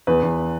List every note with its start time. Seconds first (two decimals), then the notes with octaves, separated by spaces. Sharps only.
0.07 E2 B4
0.23 E2